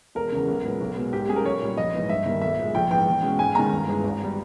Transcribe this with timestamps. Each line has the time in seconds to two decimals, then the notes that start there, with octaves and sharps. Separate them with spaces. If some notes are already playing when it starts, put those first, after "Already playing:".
0.15 E1 A#4
0.32 E2 C#3
0.48 B1
0.64 A#2 G#3 B3
0.81 B1
0.96 B2 G#3
1.13 G#2 G4
1.28 G3 C#4 G#4
1.36 A#4
1.45 B1 C#5
1.62 A#2 G3
1.77 A#1 D#5
1.93 G#2 E3
2.09 G2 E5
2.25 D#3 G3 A#3
2.41 B1 E5
2.58 A#2 G#3
2.75 A#1 G5
2.90 G#2 E3 G5
3.07 E2
3.22 B2 G#3 C#4
3.39 G#2 G#5
3.55 D#3 G#3 C#4 A#5
3.72 G1
3.88 G2 E3 G#3
4.03 G#1
4.23 G3